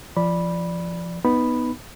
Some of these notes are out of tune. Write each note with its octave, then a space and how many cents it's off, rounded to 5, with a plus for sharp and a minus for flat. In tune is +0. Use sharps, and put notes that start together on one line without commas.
F3 -25 D5 +0 B5 -10
B3 +0 D#4 +0 B5 +0